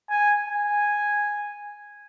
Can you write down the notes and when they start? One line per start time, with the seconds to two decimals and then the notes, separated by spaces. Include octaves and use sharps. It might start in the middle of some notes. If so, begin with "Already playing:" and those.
0.10 G#5
0.47 G#5